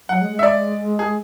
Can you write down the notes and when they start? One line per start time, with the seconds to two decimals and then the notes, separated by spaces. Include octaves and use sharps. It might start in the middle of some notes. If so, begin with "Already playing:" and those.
0.09 F#3 F#5
0.22 G#3
0.32 G#3
0.39 E5
0.43 D5
0.99 G#4